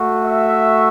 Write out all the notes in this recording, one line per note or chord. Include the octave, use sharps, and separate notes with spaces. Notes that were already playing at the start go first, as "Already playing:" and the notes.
Already playing: A3 F#4
E5